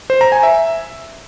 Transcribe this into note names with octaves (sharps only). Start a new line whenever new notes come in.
C5
A#5
G#5
E5